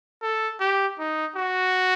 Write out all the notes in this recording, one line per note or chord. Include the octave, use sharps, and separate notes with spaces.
A4
G4
D#4
F#4